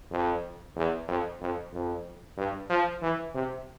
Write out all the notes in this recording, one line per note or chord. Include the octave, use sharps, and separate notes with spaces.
F2
E2
F2
F2
F2
G2
F3
E3
C3